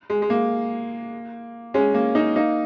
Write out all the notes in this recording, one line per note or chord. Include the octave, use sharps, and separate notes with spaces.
G#3
G#3
A#3
G#3 C#4
A#3
A#3 D#4
A#3 D#4